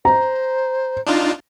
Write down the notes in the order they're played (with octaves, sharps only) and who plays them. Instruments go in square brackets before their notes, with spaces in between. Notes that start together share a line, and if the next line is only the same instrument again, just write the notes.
[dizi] C5 [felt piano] A#5
[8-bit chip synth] D4 D#4 F4